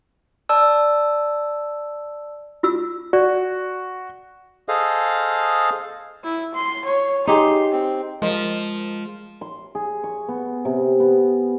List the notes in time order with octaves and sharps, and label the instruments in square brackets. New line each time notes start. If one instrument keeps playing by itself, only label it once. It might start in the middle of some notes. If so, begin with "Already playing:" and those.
[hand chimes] D5 A5 E6
[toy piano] F4 F#4 E6
[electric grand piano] F#4 [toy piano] D5
[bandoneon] G#4 A4 C5 D#5 F5
[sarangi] E4
C6
C#5
[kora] D#4 G4 G#4 [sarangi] C6
[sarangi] C4
[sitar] F3 [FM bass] G#3 [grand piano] A#4 D#5
[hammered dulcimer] C6
G#4
C#6
B3
C3
B3